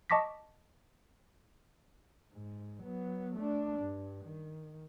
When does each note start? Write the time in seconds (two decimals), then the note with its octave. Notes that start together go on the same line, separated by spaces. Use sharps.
0.10 D#5 A5 C#6 D6 A#6 B6
2.33 G#2
2.83 F#3 B3
3.36 A3 D4
3.79 G2
4.25 D#3